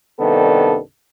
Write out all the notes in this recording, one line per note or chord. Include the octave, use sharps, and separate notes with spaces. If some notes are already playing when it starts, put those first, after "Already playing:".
C2 G2 D#3 B3 D4 A4